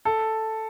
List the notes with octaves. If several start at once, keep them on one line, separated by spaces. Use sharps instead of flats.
A4